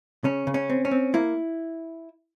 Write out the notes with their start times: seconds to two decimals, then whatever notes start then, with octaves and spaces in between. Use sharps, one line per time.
0.24 C#3 C#4
0.47 C#3
0.54 C#4
0.70 C4
0.85 C#4
0.91 C4
1.14 A#3 E4